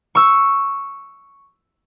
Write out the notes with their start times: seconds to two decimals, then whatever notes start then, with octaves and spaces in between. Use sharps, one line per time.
0.15 C#6 E6